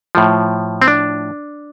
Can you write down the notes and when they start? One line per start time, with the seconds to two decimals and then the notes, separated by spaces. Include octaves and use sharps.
0.15 A2 F3
0.82 C4
0.88 D4